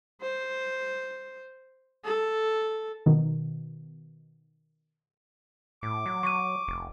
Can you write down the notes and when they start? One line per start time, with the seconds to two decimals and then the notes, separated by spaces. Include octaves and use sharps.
0.21 C5
2.04 A4
3.06 B2 D#3
5.83 A2 D6
6.06 F#3
6.23 F#3 C#6 D#7
6.68 F1